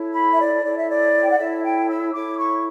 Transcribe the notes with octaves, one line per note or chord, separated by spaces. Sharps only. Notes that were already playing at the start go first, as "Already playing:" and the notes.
Already playing: E4 A4 C#5
B5
E5
D5
E4 A4 C#5 D5
E5
D5
G5
F#5
E4 A4 C#5 E5
G5
E6
E4 A4 C#5 D6
C#6